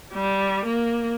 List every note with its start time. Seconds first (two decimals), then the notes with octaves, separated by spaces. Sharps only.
0.12 G3
0.65 A#3